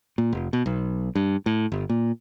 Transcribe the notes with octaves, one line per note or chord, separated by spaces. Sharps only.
A#2
F1
B2
B1
G2
A2
G1
A#2